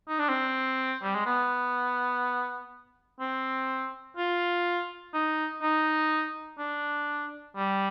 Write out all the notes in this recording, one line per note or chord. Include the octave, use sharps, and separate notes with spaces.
D#4
D4
C4
G3
G#3
B3
C4
F4
D#4
D#4
D4
G3